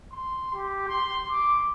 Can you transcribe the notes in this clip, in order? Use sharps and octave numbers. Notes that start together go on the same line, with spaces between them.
C6
G4
C6
D6